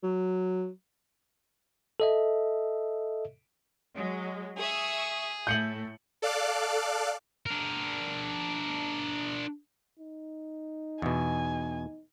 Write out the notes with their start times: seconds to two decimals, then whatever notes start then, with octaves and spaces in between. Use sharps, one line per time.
0.03 F#3
2.00 A4 D#5 E5
3.94 F#3 G#3
4.58 G#4 E5 C#6 D#6
5.47 A2 A3 G6 C#7 F#7
6.22 A4 D5 F5 D6 F#6
7.46 D4 A#4
10.00 D#4
11.02 E2 B2 G#5